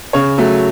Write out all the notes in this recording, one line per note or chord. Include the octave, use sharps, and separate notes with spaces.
C#3 C#5
F#3 A3